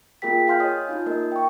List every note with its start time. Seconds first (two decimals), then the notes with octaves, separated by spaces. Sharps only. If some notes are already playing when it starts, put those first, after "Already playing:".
0.22 A#3 F4 G#4 A#4 G5 B6
0.48 F5 G#5 C6 F6 G6
0.60 C#5 D#5 D#6
0.89 D#4 F4 G6
1.06 A#3 A#4 D#5
1.32 G5 C#6